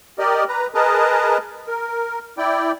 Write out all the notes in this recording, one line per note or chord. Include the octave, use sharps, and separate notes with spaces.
G4 A#4 D5 D#5
B4 A#5
G#4 A#4 B4 D#5 A5 A#5
A#4
E4 D5 G5